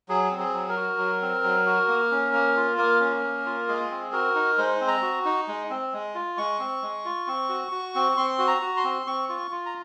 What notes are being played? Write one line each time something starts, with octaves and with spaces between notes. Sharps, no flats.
F#3 G#4
C4
G#4
F#3
A#4
F#4
F#3
C4
F#3
F#4
A#3
C#4
A#3
F4
A#3 A#4
C#4
A#3
F4
G#3 G#4
C4
F#4 A#4
D#4
G#3 C5
C4
A#5
F#4
D#4
G#3
C4
G#3
F4
G#3 C#6
C4
G#3
F4
C4
F#4
F#4
C4
C4 C6
F#4
A#5
F#4
C6
C4
C4 C#6
F4 C#6
F4
A#5